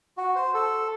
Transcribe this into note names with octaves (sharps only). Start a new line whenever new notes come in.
F#4
C5
A4